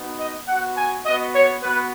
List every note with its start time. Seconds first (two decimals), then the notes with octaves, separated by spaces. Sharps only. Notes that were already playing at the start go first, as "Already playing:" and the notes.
Already playing: B3 D#4 F#4
0.20 D#5
0.48 B3 F#4 F#5
0.77 G#5
1.05 B3 F#4 D#5
1.34 C#5
1.62 B3 F#4 B4